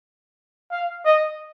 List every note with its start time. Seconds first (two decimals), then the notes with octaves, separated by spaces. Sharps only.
0.71 F5
1.05 D#5